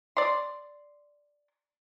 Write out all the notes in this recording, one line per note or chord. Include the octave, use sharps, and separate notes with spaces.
D5 C6